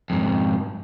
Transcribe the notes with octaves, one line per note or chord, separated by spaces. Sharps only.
F2 G#2